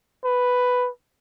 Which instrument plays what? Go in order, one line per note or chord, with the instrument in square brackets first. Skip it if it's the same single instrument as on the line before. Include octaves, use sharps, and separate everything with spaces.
[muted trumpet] B4